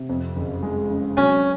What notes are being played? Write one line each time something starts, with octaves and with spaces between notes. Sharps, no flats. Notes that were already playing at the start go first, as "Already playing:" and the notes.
Already playing: C3
F2
F#1
G#3
C#3
F#3 C#4